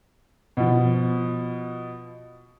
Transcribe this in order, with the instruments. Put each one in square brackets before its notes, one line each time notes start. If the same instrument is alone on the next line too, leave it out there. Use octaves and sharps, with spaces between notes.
[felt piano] B2 F3